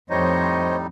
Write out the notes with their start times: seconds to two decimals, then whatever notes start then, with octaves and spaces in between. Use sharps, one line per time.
0.10 F2 A2 G3 D#4 C5 C#5 D#5